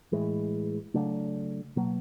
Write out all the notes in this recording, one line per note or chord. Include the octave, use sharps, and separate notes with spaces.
A2 E3 G#3
C#3 F#3 A3 D4
B2 F#3 A#3